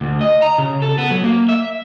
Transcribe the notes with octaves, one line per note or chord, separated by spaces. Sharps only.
D2
D#5
A#5
C#3
A4
B3
F#3
A#3
E5